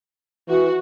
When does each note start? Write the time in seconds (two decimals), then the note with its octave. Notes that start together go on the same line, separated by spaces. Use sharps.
0.49 E3 F#4